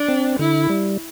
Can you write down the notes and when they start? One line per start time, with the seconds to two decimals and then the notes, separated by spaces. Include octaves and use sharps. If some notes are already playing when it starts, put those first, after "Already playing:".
Already playing: D4
0.09 C4
0.39 D3 E4
0.69 G3